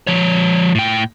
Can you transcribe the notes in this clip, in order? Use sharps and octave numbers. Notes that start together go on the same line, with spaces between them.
F3 C#5
A2 G5